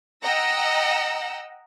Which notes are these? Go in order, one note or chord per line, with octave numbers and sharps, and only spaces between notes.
D#5 F#5 G5 A#5 E6 A#6